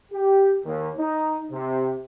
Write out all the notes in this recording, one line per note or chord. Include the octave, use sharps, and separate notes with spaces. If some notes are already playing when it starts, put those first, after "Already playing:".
G4
D#2
D#4
C3